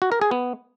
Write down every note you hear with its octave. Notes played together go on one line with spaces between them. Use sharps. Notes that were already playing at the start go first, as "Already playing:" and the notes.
F#4
A#4
G#4
B3